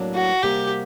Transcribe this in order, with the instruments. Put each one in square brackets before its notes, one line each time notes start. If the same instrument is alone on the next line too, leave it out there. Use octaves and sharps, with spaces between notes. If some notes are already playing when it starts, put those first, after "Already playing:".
Already playing: [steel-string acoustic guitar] A2 F#3 A#3 D4
[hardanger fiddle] F#4
[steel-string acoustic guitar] C3 G3 A#3 F#4 [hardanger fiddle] G4